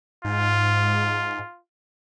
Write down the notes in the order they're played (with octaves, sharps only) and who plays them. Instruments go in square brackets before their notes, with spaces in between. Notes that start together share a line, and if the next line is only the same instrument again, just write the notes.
[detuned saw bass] G#2 [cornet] F4